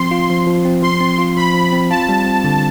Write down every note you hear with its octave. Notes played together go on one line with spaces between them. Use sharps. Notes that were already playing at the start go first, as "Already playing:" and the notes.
Already playing: F3 C4 C6
F4
F3
F3
C4
F3 C6
C4
F4
F3 B5
F3
C4
F4 A5
G3
C4
D3